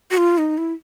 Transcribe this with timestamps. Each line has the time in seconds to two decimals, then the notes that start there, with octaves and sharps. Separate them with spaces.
0.11 F#4
0.17 F4
0.38 D#4
0.58 E4